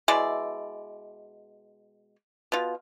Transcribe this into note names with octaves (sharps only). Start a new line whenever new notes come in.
B2 G#3 E4 D5
B2 F4